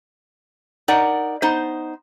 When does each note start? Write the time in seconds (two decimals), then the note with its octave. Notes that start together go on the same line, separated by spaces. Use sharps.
0.88 D#4 A#4 D5 F#5
1.42 B3 D#4 C5